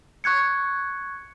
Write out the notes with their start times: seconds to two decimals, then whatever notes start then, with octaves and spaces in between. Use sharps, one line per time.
0.24 C#6 F#6 G#6 C#7